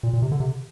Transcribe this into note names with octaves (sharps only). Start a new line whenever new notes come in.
A#2
A#2
C3
D3
C3